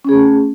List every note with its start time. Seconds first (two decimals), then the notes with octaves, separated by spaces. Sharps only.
0.05 C#4
0.09 G#4
0.13 A3